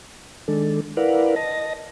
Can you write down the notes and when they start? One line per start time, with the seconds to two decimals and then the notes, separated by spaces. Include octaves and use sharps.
0.48 D#3 G#3 D4 A4
0.97 E4 A#4 B4 D5 F5 F#5
1.36 D#5 A5 A#6